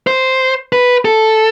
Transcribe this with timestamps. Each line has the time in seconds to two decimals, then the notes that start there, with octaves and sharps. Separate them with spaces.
0.07 C5
0.73 B4
1.05 A4